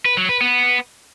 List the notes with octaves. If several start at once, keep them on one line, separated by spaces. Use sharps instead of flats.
B4
F#3
B4
B3